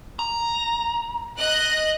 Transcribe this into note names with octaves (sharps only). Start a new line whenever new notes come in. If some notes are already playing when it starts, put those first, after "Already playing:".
A#5
D#5 F#6